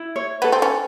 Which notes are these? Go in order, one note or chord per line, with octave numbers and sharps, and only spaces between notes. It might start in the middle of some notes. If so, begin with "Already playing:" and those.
Already playing: E4
C#5
B3 A4
C4
C#4